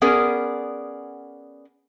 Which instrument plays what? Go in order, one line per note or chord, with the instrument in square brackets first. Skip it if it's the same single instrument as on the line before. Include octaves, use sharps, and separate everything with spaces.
[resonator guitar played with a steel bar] B3 C#4 G#4 A#4 D5